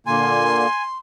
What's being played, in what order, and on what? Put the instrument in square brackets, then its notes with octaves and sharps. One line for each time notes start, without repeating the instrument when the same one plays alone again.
[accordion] A#2 D3 A#3 [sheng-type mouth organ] G#5 [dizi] C6